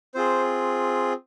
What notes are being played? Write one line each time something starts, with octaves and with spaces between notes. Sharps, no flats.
C4 F4 G#4 C5